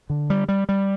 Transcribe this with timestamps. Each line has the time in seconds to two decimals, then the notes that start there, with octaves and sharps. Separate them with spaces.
0.10 D3
0.30 G3
0.49 G3
0.69 G3